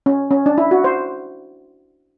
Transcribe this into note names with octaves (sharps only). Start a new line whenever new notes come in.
C#4
C#4
D4
E4
F#4
C5